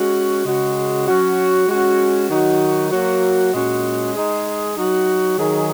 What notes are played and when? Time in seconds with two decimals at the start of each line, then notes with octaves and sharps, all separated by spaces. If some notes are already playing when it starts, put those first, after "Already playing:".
Already playing: G#3 C#4 F#4
0.45 C#3 G#3 F#4
1.07 F#3 C#4 F#4
1.68 G#3 C#4 F#4
2.29 D#3 F#3 D#4 F#4
2.91 F#3 A#3 F#4
3.53 A#2 G#3 C#4 F#4
4.14 G#3 D#4 G#4
4.75 F#3 D#4 F#4
5.37 D#3 F#3 D#4 G#4